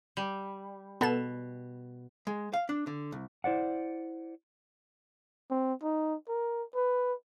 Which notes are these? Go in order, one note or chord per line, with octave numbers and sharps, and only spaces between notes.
G3
B2 B3 A4 E7
G#3
F5
D4
D3
C2
E4 C5 D5 F#5
C4
D#4
A#4
B4